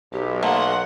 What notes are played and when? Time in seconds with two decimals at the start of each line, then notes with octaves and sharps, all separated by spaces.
0.13 B1 G4
0.43 A3 A#3 F#5 C6